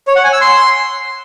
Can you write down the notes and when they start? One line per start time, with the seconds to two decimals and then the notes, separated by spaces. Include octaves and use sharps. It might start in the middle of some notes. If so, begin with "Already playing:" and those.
0.07 C#5
0.16 F#5
0.24 G#5
0.33 E6
0.41 C6